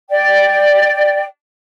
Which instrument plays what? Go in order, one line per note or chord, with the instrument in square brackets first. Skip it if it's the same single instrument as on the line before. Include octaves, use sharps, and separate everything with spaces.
[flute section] D5 G5